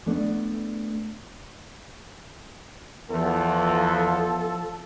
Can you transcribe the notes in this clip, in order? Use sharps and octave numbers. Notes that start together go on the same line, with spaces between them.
A3 B3 D4
E2 F3 A4